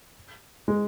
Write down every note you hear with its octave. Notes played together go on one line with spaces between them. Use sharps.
G#3